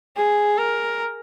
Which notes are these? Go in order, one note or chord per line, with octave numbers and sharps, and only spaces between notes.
G#4
A#4